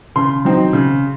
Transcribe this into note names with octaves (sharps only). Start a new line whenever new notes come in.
C#3 C6
F#3 C4 D#4
C#3